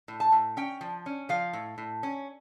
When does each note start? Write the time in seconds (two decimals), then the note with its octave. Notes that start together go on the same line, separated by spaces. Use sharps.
0.08 A2
0.20 A5
0.32 A2
0.57 C#4 G5
0.81 F3
1.06 C#4
1.29 F3 F5
1.53 A2
1.78 A2
2.03 C#4